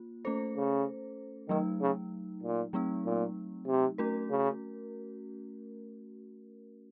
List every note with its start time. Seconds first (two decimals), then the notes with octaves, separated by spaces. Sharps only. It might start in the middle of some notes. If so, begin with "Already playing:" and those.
Already playing: A#3 F4
0.25 A3 C#4 A4 C5
0.56 C#3
1.49 D#3 F#3 A3 D#4
1.81 C#3
2.43 A#2
2.73 F#3 A3 C4 D#4
3.05 A#2
3.67 C3
3.98 A3 C#4 F#4 A#4
4.30 C#3